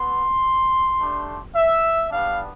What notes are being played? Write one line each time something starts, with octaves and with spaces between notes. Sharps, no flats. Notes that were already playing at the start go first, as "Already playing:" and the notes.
Already playing: B3 C6
A3 D4 G4
E5
G3 B3 D4 F5